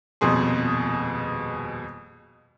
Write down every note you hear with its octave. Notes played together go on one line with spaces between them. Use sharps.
D#1 F2 B2 G#4 C6